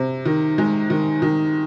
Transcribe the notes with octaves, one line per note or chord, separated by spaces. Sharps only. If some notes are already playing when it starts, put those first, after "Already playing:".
Already playing: C3
D#3
G#3
D#3
D#3